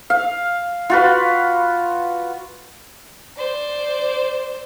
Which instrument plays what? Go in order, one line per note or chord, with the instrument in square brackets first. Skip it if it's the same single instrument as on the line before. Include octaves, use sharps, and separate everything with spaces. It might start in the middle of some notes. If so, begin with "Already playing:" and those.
[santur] F5
F4 F#4 B4
[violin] C5 D5